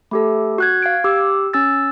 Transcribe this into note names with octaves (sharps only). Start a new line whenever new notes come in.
A3 G4 A4
F#4 F#6 G#6
F5 G#6 D7
G4 D6 E6
C#4 E6 A6